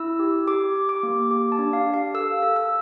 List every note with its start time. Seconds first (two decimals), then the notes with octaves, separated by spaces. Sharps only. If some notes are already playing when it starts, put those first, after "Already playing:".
Already playing: E4 E6
0.19 G4
0.48 G4 D6
0.75 G4
0.89 D6
1.03 A#3
1.31 G4 D6
1.52 A5
1.59 D4
1.73 F5
1.86 G4
1.94 F5
2.14 A4 E6
2.43 A4
2.56 E6